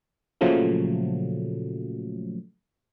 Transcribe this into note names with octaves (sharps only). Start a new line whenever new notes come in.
A#2 C#3 F3 F#3 A3